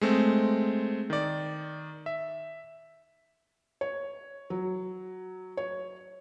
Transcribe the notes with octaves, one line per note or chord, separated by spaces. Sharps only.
G#3 A3 C4
D#3 D5
E5
C#5
F#3
C#5